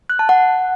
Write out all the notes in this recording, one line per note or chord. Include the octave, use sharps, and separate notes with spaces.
F#6
A5
F#5